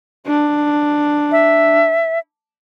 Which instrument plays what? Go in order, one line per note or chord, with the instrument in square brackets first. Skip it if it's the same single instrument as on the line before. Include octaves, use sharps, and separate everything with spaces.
[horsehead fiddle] D4
[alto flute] E5